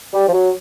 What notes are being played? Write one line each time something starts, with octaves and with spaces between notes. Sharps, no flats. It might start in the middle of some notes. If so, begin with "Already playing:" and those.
G3
F3
F#3